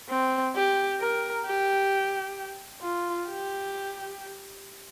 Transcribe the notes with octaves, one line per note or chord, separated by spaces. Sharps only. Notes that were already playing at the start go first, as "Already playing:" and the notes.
C4
G4
A#4
G4
F4
G4